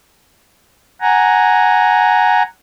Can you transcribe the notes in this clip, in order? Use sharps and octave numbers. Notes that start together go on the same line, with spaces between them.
F#5 G#5 A#5